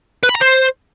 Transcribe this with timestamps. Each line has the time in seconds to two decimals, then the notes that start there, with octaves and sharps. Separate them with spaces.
0.23 B4
0.29 B5
0.35 A#5
0.41 C5